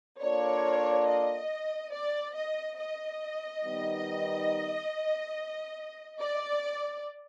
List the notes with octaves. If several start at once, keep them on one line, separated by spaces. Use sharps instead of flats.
A#3 D4 F4 A4 C#5 D5
D#5
D5
D#5
D#5
D#3 G3 B3 D#4
D5